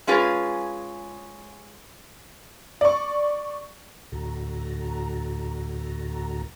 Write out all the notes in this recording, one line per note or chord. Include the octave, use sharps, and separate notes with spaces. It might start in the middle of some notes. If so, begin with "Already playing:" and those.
G#3 C#4 F4 G#4 B4
D5 C#6
D2 A2 D3 F#4 A4 A#5